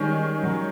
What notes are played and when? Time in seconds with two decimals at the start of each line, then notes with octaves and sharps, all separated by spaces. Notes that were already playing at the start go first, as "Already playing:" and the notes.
Already playing: D#3 G3 G#3 C#4
0.43 F#3